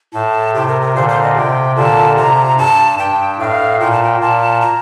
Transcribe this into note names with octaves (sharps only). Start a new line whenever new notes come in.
A2 A5
C3 G5
A#4
A#4
A#2 D3 C5
C5
D#5
C3 G5
A#2 D3 A5
C3 A#5
G2 A5
G2 G5
A2 F5
A#2 G5
A5
G5
A#2 A5
A#5